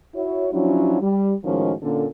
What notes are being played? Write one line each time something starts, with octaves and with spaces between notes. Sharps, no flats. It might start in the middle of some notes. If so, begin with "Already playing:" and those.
E4 F#4 C#5
F3 F#3 C#4 D4 E4 F#4
G3
A2 D#3 F3 G#3 C#4 F#4
A#2 D3 A#3 C#4 A4